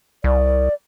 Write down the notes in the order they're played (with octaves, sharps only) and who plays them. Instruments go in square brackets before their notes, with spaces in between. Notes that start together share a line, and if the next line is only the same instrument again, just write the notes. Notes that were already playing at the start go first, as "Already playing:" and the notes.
[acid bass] C2 [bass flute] D5